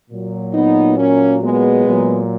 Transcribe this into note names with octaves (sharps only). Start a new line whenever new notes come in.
A#2 F#3
B3 D#4
A#3 C#4
G#3 B3
A#2 F#3